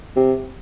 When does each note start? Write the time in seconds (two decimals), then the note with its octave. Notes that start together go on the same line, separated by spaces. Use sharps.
0.16 C3